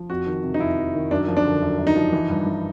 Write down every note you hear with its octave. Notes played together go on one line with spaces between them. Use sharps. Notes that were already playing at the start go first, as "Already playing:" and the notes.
Already playing: F3
F2 F#4
D#3
C3
D#4
F2 E4
F2
D#3
F#2 D4
F3
D4
D3
F#2
F#2
D#4
F3
E3
G2
E3